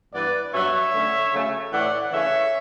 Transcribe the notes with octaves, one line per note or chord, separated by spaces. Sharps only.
G2 E3 B3 B4 D5
G2 F#3 B3 C#5 E5
D3 A3 C#4
C#3 F#3 A3 C#4
A2 E3 A3 D5 F#5
C#3 E3 A3 C#4 C#5 E5